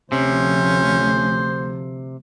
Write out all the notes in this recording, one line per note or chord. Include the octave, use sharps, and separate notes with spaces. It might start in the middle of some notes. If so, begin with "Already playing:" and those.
D2 C3 F3 C#4 C5